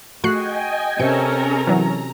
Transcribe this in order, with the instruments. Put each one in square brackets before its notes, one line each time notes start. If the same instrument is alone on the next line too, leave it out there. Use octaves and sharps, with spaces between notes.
[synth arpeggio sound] A3 F#6 C7 [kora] F#4 G#4 [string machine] D#5 G5 G#5
[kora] C3 [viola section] C#4 A4 A#4 [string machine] A#5 [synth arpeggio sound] C#7
[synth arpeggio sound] E3 F#3